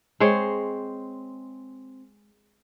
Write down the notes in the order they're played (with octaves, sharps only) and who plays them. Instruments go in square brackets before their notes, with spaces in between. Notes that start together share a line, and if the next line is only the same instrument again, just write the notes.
[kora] G#3 C4 C5 C#5